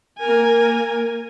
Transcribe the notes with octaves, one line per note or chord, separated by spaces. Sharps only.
A#3 A#4 G#5